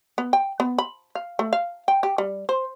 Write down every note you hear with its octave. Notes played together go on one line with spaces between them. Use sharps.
B3
G5
B3
B5
F5
A3
F5
G5
G4
G3
C5